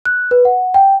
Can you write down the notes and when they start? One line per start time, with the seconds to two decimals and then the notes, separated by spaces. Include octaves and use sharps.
0.05 F#6
0.31 B4
0.45 F#5
0.74 G5